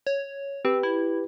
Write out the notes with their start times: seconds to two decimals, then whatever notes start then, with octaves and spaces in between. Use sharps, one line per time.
0.07 C#5
0.65 C4 G4 B4
0.83 E4